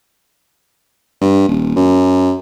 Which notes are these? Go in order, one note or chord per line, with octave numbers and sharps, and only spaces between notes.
G2
D#1
F#2